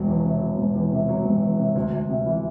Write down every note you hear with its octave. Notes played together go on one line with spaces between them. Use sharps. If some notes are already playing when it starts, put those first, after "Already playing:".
Already playing: E1 F#3
E2
C3
F#3
E1
E2
C3
F#3
E1
E2
C3
D2
D2
C3
E3